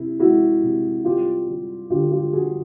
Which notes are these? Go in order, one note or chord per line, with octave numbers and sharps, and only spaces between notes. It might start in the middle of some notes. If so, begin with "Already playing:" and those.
Already playing: C3 E4
G#3 E4 F#4
C3
G3 F4 G4
G3
D3 F4 G4
F4 G4
G3 F#4 G#4